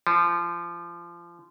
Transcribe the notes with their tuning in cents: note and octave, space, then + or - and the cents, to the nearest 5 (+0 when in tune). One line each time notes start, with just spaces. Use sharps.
F3 -25